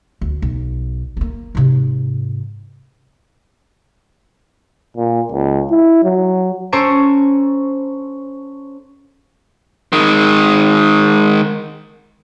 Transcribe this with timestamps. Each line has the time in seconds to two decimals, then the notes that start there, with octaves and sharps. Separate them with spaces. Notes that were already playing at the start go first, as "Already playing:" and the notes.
0.21 D2
0.42 B1
1.17 A#3 B3
1.55 G#2 C3
4.97 A#2
5.32 C#2
5.70 E4
6.04 F#3
6.72 C#4 A4 C5 A#5 C#6 D7
9.93 D#3 G#3